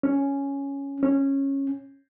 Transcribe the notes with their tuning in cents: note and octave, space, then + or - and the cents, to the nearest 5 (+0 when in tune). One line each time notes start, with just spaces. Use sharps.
C#4 +0
C#4 -15